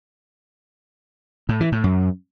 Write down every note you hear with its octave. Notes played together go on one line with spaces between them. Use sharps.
A2
E3
A2
F#2